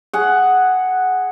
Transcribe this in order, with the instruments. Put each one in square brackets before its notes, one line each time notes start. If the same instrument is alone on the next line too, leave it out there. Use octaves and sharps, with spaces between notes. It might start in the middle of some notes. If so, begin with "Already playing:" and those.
[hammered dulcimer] G#4 F#5